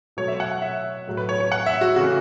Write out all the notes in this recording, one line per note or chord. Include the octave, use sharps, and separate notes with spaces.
B2 F#3 A3 C#5
E5
F#5
F#5
E5
A2 F#3 A3
B4
C#5
C#5
F#5
E5
F#4
C#3 E3 A3 F#4